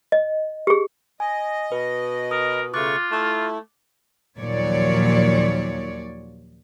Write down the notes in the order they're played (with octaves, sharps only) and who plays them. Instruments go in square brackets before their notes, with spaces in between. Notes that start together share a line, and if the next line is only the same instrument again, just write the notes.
[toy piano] D#5
G4 G#4
[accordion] D#5 [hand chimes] G#5
[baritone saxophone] B2 [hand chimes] B4
[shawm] A#4 [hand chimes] D#6
[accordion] C#3 A3 C#6 [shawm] F4 [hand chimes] D6 F#6 A6
[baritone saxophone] A3 [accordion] E4
[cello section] D#2 A#2 F3 F#3 C#5 D5